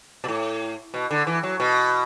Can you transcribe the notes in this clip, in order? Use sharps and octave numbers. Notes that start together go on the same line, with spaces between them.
B2
A2
B2
D3
E3
F#3
B2